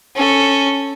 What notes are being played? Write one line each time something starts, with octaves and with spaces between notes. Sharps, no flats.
C#4 A4